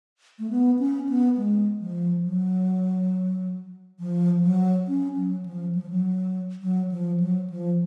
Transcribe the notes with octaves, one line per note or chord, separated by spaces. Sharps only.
A3
B3
C#4
B3
G#3
F3
F#3
F3
F#3
C#4
F#3
F3
F#3
F3
F#3
F#3
F3
F#3
F3